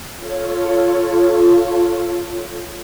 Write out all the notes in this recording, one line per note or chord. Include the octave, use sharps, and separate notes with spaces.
F4 A4 C#5